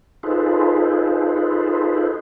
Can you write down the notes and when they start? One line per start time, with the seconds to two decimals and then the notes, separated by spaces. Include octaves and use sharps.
0.23 D#4 F4 G#4 A4 B4 C5